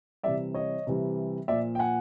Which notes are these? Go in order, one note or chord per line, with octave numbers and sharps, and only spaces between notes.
C3 E3 G3 D5 E5
C#5 D#5
C3 E3 G3
A#2 F3 D5 E5
G5
F#5 G#5